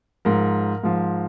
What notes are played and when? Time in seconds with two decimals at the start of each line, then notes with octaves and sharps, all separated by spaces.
0.25 G#2 F3 A#4
0.83 G#2 F3